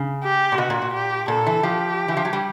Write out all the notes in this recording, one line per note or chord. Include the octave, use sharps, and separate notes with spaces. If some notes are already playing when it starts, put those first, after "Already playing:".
Already playing: C#3
G4
A#2
B2 F#4
A#2
A#2
G4
A#2 A4
E3
F3 G4
E3
F3
F#3
G3